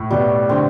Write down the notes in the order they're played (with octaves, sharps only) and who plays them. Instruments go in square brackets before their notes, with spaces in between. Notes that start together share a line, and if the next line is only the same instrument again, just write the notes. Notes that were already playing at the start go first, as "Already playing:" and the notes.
Already playing: [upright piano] A2
[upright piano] B2 [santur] G3
[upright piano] D3 [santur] C4